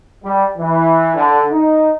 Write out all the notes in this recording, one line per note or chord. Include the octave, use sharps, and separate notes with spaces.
G3
E3
D3
D#4